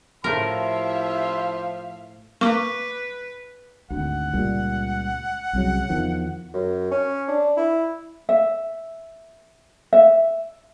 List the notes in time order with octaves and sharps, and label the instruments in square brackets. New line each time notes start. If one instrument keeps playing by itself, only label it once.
[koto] A2 A#4 [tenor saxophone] F3 [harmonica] E4 C6 [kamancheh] E5 F5
[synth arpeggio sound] A#3 [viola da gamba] B4 [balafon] C#6 D6
[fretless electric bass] G#1 D2 [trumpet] F#5
[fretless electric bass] C#2 A#2 G3
C2 C#3 F#3
E2 D#3 F3
[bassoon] F#2
C#4
D4
E4
[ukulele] E5
E5